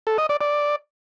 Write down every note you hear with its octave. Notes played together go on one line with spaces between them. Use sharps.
A4
D#5
D5
D5